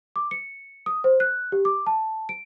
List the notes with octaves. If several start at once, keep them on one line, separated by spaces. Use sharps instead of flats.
D6
C#7
D#6
C5
F#6
G4
D6
A5
D7